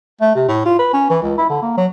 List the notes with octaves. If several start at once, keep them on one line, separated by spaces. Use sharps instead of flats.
A3
C3
A2
F4
B4
C#4
E3
C#2
E4
D3
A#3
F#3